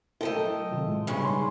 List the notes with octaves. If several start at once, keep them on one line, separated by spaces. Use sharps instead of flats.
A3 E4 A4 A#4 D#5 G5
F#3
C3 D#3 F4
A2 G#3
G2 C#3
D#4 C6